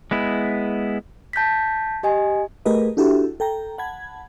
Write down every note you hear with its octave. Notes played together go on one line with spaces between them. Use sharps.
G#3 B3 E4
A5 G6 A#6 B6
G4 D#5 G#5
A3 G4 G#4 A#4 B4 D#5
D4 E4 F#4 G4 A4 E5
A4 G5 A#5
F#5 A5 B5 G#6